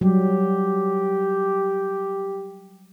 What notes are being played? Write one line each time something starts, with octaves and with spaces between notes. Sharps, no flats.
F#3 G3 G4